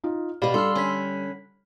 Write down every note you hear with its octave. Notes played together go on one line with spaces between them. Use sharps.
D#4 F4
B2 B3 G4 D5 F5 B5
G3 D4 A4 C6 E6 F6
D3 C#4 B5 B6